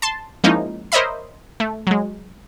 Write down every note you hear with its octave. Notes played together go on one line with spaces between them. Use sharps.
A5 C6
F3 G#3 A#3 C#4 D#4 E4
A#4 C5 C#5 D#5 E5 B5
A3
F#3 G#3